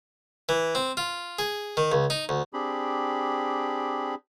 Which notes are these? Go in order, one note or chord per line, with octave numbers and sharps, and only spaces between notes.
E3
C4
F4
G#4
D#3
C#2
D#4
D2
C4 D4 G4 G#4 B5